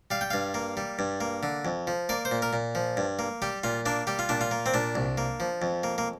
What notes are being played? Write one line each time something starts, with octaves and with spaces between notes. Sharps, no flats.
G3 F5
G5
G2 F5
A#3
G3
G2
A#3
D3
F2
F3
A#3 D5
C5
A#2
A#4
A#2
F3
G2
A#3
G3 G4
A#2 F4
A#3 D4
G3 G4
F4
A#2 D4
F4
A#3
C4
A#2 D4
C2
A#3
F3
F2
A#3
A#3